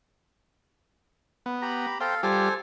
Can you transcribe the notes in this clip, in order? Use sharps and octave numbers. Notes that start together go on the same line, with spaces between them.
B3
G4 A#5 B5
A4 C5 F5 G5
G3 F4 G4 A4 C5 G#5